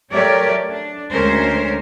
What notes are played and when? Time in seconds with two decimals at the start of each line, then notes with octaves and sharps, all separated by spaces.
0.12 F#3 A3 G4 A#4 C#5 D5
0.70 D4
1.13 D2 G#3 C#4 A#4 C5